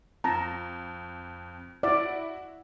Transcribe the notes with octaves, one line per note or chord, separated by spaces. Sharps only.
F2 A5 A#5
E4 F#4 D5